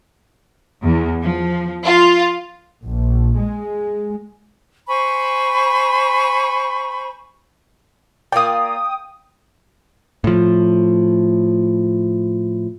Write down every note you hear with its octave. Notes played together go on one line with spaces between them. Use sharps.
E2
F3
F4
A#1
G#3
C5 G#5 B5 C#6
A#3 F4 D5 G5 D#6
A2 F3